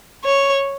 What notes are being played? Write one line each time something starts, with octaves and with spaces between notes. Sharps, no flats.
C#5